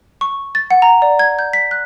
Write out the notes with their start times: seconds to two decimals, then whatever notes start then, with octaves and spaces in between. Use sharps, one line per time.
0.21 C#6
0.55 A6
0.71 F#5
0.82 A#5
1.02 D5
1.19 G#6
1.39 G6
1.53 B6
1.71 F#6